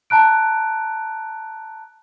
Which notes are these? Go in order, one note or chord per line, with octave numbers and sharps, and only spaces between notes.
A5 A#5 F#6 D7